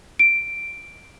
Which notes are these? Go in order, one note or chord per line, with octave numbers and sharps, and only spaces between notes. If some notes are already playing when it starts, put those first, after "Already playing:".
D7